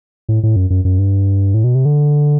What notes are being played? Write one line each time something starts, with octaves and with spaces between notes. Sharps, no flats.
A2
A2
F#2
F#2
F#2
G2
A2
B2
C3
D3